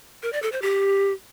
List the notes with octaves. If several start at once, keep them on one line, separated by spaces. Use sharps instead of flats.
A#4
D5
A4
C5
G4